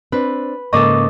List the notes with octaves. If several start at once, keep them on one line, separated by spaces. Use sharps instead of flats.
C4 D4 B4
G#2 C#3 A#3 A4 D#5 C#6 D6